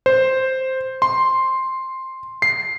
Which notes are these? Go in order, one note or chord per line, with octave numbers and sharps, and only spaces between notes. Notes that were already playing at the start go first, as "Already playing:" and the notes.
C5
C6
C7